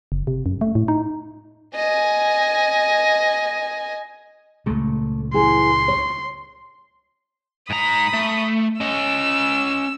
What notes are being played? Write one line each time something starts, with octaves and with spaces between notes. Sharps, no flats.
F#1
C3
F#2
A3
A2
D#4
D#5 G#5
C#2 A#2 A3
E3 E4 G#4 C6
C#5
G#2 A#5 B5 D#6
A3
C#4 D#5 E6